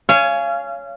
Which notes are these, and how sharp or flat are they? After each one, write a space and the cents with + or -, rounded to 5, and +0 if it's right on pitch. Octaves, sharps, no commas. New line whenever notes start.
C#5 +15 F5 -25 G#5 +5